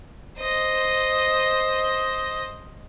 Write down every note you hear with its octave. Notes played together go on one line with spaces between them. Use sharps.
C5 D#5